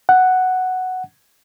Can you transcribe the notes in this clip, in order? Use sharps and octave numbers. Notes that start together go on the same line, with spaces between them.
F#5